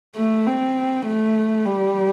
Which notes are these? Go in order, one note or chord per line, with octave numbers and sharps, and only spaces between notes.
A3
C4
A3
G3